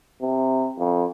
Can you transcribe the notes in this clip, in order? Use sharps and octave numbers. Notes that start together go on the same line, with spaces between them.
C3
F2